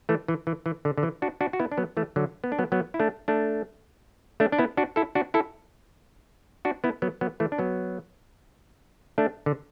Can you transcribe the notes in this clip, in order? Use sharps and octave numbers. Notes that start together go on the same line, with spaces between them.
E3 A3
E3
E3
E3
D3
D3
E3
D4 F#4
D4 F#4
F#4
B3 E4
D4
F#3 B3
E3 A3
D3 F#3
B3
D4
F#3 B3
F#3 B3
E4
A3 D4
A3 D4
A3 D4
D4
B3 E4
D4 F#4
E4 A4
D4 F#4
E4 A4
D4 F#4
B3 E4
F#3 B3
F#3 B3
E3 A3
D4
F#3 B3
A3 D4
D3